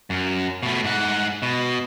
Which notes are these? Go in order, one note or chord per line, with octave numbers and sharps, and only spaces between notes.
F#2
B2 A3
G#2 F#5
B2